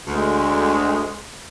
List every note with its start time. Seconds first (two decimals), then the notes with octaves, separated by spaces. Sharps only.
0.07 D2 G#3